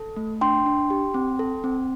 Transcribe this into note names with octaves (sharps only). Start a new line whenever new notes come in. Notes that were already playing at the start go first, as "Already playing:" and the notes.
Already playing: A4
A3
D4 G5 C6
D4
G4
C4
A4
C4